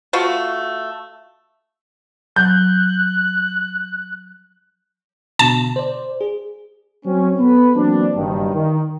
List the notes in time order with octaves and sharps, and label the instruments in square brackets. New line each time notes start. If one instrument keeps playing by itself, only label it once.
[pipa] A3 F4 F#4
[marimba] F#3 [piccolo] F#6 [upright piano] G6
[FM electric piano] B2 D3 [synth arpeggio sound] A5
[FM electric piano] C5 D5
G#4
[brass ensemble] F#3 C4 C#4
B3 A4 B4
E3 F#3 A#3 C4 D4
F#1 G2 D#3
D#3